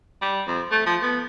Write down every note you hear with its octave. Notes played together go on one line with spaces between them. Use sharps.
G3
F2
A3
F3
B3